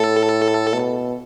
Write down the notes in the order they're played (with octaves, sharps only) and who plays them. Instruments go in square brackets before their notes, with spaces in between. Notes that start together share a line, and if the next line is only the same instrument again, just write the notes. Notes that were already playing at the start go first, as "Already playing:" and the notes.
Already playing: [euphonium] A2 [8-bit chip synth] A4
[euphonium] B2